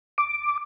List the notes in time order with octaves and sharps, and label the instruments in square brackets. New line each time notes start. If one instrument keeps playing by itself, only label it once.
[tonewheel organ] D6